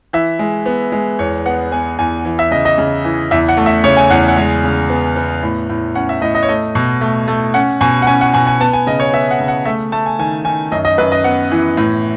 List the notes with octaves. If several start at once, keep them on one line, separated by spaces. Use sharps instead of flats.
E3 E5
G#3
B3
G#3
E2 C#5
B3 F#5
B3 G#5
E2 G#5
E3
E5
C#3 D#5
D#5
C#3
E3
E2 E5
F#5
A3
E5
C#3 C#5
G#5
E2 F#5
F#5
G#3 G#5
C#3
B3
B3
A2
A2
C#4 F#5
E5
A2 D#5
D#5
C#5
A3 D#5
B2
A3
A3
C#4 F#5
B2 G#5
F#5
C#4 G#5
F#5
B2 G#5
G#5
B3 A5
G#5
C#3 D#5
C#5
B3 E5
F#5
C#3
F#5
A3 E5
A3 A5
G#5
D#3 G#5
D#3 G#5
F#2 D#5
D#5
F#2 B4
D#5
B3 F#5
E3
A2